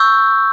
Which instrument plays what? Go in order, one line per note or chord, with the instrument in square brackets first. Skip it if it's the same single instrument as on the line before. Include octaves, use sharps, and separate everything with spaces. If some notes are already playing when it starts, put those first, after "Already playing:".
Already playing: [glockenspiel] C#6 E6 G6